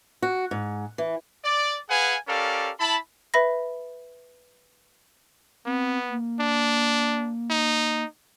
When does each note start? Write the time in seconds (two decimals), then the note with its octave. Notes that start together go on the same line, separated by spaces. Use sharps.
0.22 F#4
0.51 G#2
0.98 E3
1.44 D5
1.90 G#4 B4 F5 F#5 G#5
2.28 C#4 G4 A4 A#4 D5 F5
2.79 E4 A5 B5
3.34 B4 E5 B5 A#6
5.66 B3 C4
6.10 A#3
6.40 D4
7.50 D#4